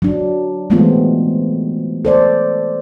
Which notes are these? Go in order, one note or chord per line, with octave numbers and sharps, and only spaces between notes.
F#3 D4
E3 G#3 A3 B3 C4 F4
A4 C5 D5